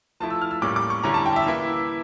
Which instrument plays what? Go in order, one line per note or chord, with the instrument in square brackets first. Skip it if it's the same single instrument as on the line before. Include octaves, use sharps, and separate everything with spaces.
[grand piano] F3 A3 E4 A5
E6
F6
E6
A2 G3 A#3 C#4 D6
D6
C#6
D3 G3 C#4 E4 A#5
A5
G5
E5
E3 A#3 E4